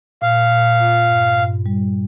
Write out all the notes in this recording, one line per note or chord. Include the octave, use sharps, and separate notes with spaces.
A#2 F5
A#2
F4
G2
G2
G3